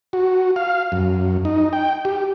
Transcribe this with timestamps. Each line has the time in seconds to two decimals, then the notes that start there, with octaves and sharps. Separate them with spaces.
0.13 F#4
0.56 F5
0.92 F#2
1.45 D#4
1.73 G5
2.05 G4